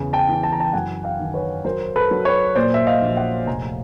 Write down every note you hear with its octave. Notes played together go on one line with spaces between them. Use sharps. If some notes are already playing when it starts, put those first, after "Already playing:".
Already playing: E2 C#3
G5 A5
E3
A5
A#5
G5 A5
F#2 F#5 G#5
F5 G5
D#3
B4 C#5
F#3 A#4 C5
A4 B4
F#3
B4 C#5
A#2 C5 D5
E5
D#5 F5
A#1
E5 F#5
F1 G#5 A#5